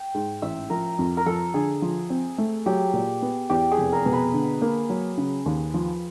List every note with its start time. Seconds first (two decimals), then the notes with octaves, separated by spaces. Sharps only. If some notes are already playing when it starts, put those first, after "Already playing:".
Already playing: G5
0.15 G#2
0.42 A1 E5
0.70 F3 A#4
0.99 F2
1.17 A#4
1.26 F3 A4
1.54 D3 G#4
1.82 F3
2.10 C4
2.38 A3
2.66 F#3 G4
2.93 A#2
3.22 B3
3.50 E2 G4
3.71 G#4
3.78 F1
3.92 A#4
4.06 B2
4.13 B4
4.33 D3
4.62 A#3
4.89 F#3
5.18 C#3
5.46 D#2
5.74 F3